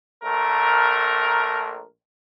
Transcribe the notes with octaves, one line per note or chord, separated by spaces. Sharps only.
A#1 A3 A#4